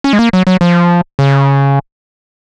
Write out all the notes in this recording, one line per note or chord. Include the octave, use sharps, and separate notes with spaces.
C#4
G#3
A#3
F#3
F#3
F3
C#3